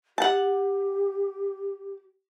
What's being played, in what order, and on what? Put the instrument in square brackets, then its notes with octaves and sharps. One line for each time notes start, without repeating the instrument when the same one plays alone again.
[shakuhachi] G4 [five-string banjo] F#5 A5